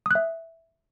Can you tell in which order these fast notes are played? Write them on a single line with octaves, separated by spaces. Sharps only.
D#6 F#6 E5